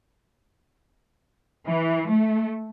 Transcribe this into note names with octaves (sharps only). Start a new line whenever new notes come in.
E3
A3